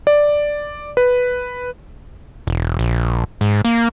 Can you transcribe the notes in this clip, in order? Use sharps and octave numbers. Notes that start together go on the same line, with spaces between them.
D5
B4
E1
A#1
G#2
A#3